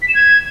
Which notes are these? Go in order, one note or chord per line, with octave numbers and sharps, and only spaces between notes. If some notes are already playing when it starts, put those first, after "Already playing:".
B6
E7
G#6